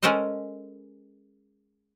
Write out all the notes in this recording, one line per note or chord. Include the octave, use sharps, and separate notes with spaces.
G#3 C#4 A4 A#4 C5 D#5